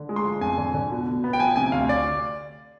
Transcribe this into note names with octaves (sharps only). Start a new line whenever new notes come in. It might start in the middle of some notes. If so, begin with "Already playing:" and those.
Already playing: D3
G#3
C6
F3
F2 G#5
D3
D3
B2
B2
B3
G5
F3 G#5
C3 G#5
D2 F5
D5